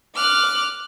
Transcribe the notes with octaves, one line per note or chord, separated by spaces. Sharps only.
D6 F6 F#6